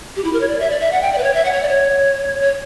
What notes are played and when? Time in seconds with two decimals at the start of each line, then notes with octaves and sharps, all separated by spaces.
0.16 G4
0.24 E4
0.33 A#4
0.41 C#5
0.48 D5
0.60 E5
0.70 D5
0.80 E5
0.92 F#5
1.02 G5
1.13 D5
1.18 B4
1.23 C#5
1.34 E5
1.45 F#5
1.53 C#5
1.62 D5
1.69 C#5
2.42 C#5